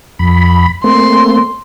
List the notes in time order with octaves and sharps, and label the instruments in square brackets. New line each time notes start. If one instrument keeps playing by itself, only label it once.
[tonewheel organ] F2 B5
[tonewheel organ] A3 A#3 C4 [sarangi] C6